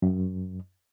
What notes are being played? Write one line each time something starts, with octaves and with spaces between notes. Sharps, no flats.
F#2